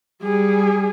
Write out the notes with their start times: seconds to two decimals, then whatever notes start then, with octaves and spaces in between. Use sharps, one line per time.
0.22 G3 G#4